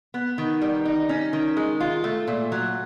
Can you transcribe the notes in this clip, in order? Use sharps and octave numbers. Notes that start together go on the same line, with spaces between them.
B3
D#3
G3
D#4
C#4
D#3
G#3
F4
A3
A#2
F#3